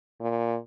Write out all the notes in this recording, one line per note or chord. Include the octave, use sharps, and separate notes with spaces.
A#2